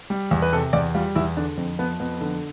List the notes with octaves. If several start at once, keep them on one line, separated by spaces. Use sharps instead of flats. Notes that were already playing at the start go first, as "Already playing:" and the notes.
G3
E2
B4
C3 A4
E2 D5
G3 F4
E2 E4
D3 D4
F2 C4
F3 B3
F2 B3
D3